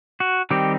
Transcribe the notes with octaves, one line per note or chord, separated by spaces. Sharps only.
F#4
D#3 G3 C4 D#4 G4